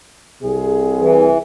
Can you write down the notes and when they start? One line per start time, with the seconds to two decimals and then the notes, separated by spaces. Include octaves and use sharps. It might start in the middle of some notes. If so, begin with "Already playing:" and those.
0.42 C2 C3 G#4
0.99 E3